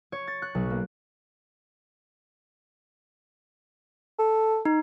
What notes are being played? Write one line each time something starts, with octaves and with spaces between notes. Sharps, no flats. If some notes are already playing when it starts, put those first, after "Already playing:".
C#5
A6
F#6
B1
A#3
A4
D#4